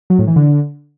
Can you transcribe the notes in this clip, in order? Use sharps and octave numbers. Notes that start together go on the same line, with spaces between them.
F#3
A2
E3
D3